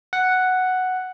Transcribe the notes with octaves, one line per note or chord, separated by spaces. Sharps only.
F#5